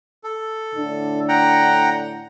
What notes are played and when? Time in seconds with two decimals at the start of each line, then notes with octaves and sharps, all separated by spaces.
0.24 A4
0.75 A2 D3 D4
1.29 F#5 G5 A#5